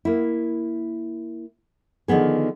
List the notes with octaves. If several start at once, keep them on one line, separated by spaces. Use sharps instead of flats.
A#3 E4
D3 D#3 F3 B3 G#4